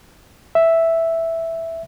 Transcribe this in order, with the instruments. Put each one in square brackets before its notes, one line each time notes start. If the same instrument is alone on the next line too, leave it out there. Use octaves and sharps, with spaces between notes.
[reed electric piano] E5